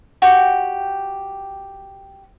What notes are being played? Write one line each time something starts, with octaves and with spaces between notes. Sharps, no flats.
F#4 G4 G5